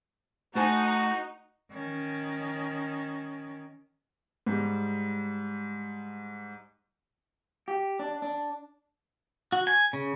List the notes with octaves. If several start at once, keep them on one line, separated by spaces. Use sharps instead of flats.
A3 D#4 F#4 C5 G#5
D#3 C#4
G#2 G3
G4
D4
D4
F#4
G#5
C#3